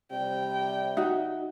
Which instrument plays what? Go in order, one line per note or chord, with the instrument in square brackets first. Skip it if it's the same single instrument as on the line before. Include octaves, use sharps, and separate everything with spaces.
[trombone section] C3 G3 [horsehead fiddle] G5
[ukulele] D#4 F#4 E5